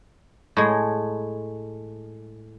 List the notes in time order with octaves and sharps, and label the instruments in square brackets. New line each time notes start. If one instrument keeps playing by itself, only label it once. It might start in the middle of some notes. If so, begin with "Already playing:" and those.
[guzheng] A2 G#3